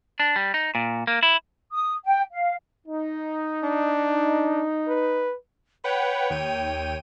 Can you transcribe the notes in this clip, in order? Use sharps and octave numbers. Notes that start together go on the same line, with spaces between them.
D4
G3
D#4
A#2
A#3
E4
D#6
G5
F5
D#4
D4
B4
B4 C#5 F#5 G5
D#2 G5 D#7